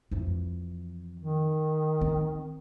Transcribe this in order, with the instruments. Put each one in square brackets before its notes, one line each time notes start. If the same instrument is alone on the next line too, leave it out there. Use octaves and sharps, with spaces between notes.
[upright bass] F2 E3
[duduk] D#3
[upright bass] C4